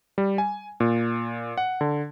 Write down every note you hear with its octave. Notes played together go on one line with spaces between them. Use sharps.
G3
G#5
A#2
F#5
D3